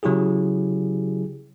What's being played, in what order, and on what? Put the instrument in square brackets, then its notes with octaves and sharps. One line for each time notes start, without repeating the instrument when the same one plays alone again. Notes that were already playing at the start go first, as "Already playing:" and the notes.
[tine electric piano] C#3 F#3 E4 G4 G#4